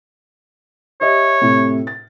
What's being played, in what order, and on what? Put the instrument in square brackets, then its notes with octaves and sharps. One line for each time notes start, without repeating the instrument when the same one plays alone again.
[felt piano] G4 D#5 E5 [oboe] C#5
[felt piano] A2 C3
A6